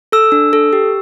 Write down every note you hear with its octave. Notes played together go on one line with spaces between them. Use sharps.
A4 E6
D4
A4
G4